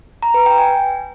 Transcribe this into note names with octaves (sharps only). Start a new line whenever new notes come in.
A#5
B4
G5
G#5